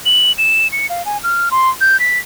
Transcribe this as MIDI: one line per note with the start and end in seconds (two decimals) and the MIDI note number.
0.06 0.32 102
0.38 0.68 100
0.72 0.87 97
0.90 1.05 77
1.06 1.18 80
1.24 1.49 89
1.51 1.69 84
1.81 1.99 91
2.00 2.19 95